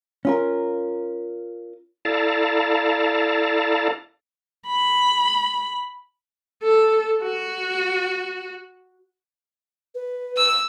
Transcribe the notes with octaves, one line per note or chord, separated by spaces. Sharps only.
C#4 F4 A#4
E4 A4 D5 F5 A5 A#5
B5
A4
F#4
B4
E6